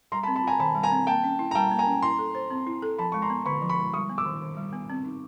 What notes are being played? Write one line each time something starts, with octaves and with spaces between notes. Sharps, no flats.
G3 A#5 C6
A5 B5
C4
A5 B5
F4 G#5 A#5
D#3 A5 B5
G3
G#5 A#5
C4
A#3 G5 A5
C#4
E4
A#5
G3 G5 A5
A#3
G#5 A#5
C#4
E4 A#5 C6
A4
C5
C4
E4
A4
F3 A5 B5
G#3 C#6
A#5 C6
B3
D3 B5 C#6
F3
B5 C#6
G#3
G3 C#6 D#6
B3
D6 E6
D#3
D#3
G3
B3
C4
D#4